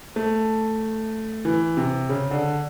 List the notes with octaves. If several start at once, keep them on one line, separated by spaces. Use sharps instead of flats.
A3
E3
C3
C#3
D3